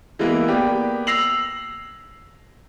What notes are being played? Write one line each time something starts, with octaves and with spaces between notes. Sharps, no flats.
E3 G#3 A#3 B3
A#3 B3 G4 D5
E6 A#6 C7 F7 F#7